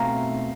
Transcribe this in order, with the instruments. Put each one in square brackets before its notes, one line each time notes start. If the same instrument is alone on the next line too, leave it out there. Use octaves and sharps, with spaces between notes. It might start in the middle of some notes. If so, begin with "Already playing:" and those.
Already playing: [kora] B2 A3 C4 [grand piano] E5 F5 A#5